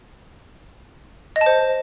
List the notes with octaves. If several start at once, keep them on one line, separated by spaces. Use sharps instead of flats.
D#5
A5
C5